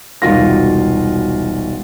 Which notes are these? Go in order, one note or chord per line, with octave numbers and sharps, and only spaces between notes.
E1 C2 D#3 F4 F#4 A#6